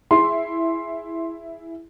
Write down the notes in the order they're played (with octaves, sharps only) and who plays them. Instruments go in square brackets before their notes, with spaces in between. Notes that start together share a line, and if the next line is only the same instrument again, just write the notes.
[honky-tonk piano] E4 G#4 [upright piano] C6